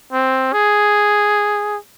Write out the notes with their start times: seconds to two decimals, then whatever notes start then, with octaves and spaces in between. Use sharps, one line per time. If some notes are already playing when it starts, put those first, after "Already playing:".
0.13 C4
0.53 G#4